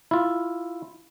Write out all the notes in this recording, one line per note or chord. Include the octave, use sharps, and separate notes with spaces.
E4 F4